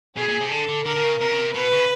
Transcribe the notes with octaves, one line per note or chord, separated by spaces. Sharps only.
B2 G#4
A#2
C3
D3 A4
D3
D3 A#4
D3
C#3
C3 A#4
C#3
C3
B2 B4
C#3